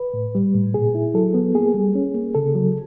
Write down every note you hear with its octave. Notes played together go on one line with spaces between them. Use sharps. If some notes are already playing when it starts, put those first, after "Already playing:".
Already playing: B4
A2
G3
A2
A#2 G#4
E4
F#3 A4
B3
A#3 G#4
G3
C#4
A#3
C#3 A4
F#3